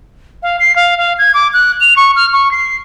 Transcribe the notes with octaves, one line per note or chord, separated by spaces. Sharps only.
F5
C7
F5
F5
G#6
D6
F#6
F7
C#6
F6
C#6
C7